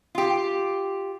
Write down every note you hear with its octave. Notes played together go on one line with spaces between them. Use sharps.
F4 G4